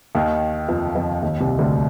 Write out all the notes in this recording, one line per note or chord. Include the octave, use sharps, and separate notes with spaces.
D#2 D#3
F2 F3
F2 F3
D#2 D#3
C2 C3
D2 D3